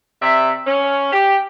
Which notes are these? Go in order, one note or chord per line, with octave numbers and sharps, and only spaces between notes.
C3 D5 E5
C#4
G4